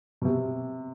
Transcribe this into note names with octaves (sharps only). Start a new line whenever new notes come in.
B2
C3